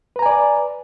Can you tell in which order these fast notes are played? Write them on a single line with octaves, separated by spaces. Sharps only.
B4 A#5 G#5 D5